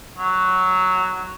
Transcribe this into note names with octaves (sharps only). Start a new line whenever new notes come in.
F#3